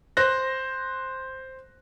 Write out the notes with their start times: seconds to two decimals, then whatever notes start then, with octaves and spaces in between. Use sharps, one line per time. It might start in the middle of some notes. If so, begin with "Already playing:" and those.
0.17 C5 F#6 A#6